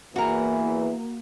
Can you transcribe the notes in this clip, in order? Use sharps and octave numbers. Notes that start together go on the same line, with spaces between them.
E2 E3 A#3 F#4 A#4